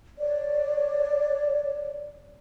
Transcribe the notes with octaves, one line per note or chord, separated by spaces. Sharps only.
C#5 D5